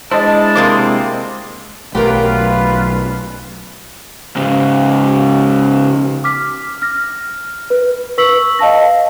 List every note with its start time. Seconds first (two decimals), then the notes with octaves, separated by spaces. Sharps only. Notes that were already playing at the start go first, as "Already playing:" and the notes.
0.11 G#3 D4 E4 C5 D#5 A5
0.55 C3 A#3 C4 D6 D#6 A6
1.95 B1 F#3 A3 F4 G4 A#4 B4
4.36 G#2 C#3
6.24 D6 F6 B6
6.82 F6 A#6
7.70 B4
8.18 B4 C#6 E6 B6 F#7
8.59 D#5 F5 A5 A#6